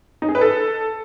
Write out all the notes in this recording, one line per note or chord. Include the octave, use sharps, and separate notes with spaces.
D#4
G#4
B4
A4